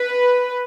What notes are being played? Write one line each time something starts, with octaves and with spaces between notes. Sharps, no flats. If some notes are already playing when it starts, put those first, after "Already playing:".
Already playing: B4